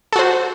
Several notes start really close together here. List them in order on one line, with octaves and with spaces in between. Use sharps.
A4 F#4 C5